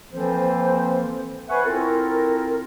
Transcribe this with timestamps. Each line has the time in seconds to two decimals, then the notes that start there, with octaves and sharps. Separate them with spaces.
0.11 E3 F3 A#3 C4 A4 C5
1.49 B4 C5 E5 F#5 G#5 C#6
1.64 C4 E4 F4 A4 A#4